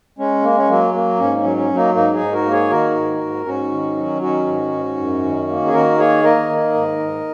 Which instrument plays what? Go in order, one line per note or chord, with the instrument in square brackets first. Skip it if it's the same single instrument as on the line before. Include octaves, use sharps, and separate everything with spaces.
[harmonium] G#3 C#4
A#3
C#4
F#3 A#3
A#3
G#2 C#4
C#4
F#3
C#4
F#3
A#3 D#4
G#2 A#3 D#4
D#4 G#4
G#2
F#4 A#4
A#3
G#4 C#5
D#3 F#4 A#4
G#2
G#2
G#2 C#4 F#4
D#3
F#3
D#3 C#4 F#4
G#2
G#2
F#2
D#3
A#3
G#4
D#3 F#4 A#4
A#3 G#4 C#5
A#3 A#4 D#5
D#3
G#2
G#2